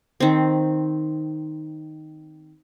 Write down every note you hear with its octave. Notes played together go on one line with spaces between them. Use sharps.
D#3 C4